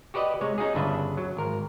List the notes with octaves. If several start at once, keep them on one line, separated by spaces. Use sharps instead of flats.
F#4 G4 B4 D5 D#5
C3 G#3 C#5
C#4 D#4 F#4 G#4
G1 C#3 D4 B4 E5
F#3
G#1 A#4